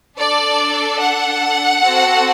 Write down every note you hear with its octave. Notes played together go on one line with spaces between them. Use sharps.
D4 A4 D5
F#5
C4 F#4 A4